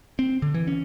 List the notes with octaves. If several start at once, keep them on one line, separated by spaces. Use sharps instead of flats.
C4
D3
E3
C#4